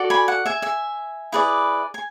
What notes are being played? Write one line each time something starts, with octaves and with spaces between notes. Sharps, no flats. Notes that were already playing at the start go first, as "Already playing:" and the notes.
Already playing: F#4 A4 D5
G#5 B5
F#5
E5 G#5
E5 G#5
E4 G#4 B4 D5
G#5